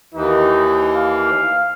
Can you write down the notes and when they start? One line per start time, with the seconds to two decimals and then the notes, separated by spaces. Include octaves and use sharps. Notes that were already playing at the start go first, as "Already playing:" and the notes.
0.14 D#2 E3 D#4
0.95 F5